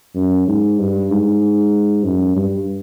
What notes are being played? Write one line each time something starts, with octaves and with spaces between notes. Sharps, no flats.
F#2
G#2
G2
G#2
F#2
G2